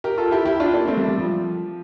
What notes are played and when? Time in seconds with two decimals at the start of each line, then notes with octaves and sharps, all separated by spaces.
0.04 G4 A#4
0.18 F4 A4
0.31 E4 G4
0.45 E4 G4
0.60 D4 F4
0.73 A#3 D4
0.88 A3 C4
0.97 G3
1.08 G3
1.18 F3